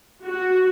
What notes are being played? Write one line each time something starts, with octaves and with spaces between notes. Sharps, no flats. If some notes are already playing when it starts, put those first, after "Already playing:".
F#4